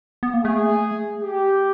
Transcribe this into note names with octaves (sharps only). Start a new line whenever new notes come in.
B3
A#3
A3 G#4
G4